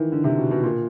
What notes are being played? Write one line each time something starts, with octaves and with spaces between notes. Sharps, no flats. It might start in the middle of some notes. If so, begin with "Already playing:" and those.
Already playing: D#3 E3
D3
C3
B2
B2
A#2